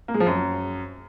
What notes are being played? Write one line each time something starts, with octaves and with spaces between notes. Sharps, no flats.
A#3
G#3
F3
F#2